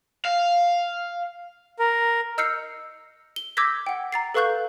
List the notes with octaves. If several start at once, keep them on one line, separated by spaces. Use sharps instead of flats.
F5
A#4
D#5 E6 F6 G6 C7 C#7
G7
D6 E6 G6 G#6 A#6 B6
F#5 G5
A#5 A6 C7
A4 B4 F5 C#6 F#6 G6